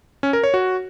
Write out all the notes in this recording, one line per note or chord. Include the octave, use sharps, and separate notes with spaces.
C#4
A#4
C#5
F#4